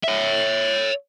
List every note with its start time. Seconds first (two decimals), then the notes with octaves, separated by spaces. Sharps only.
0.03 C#5 E5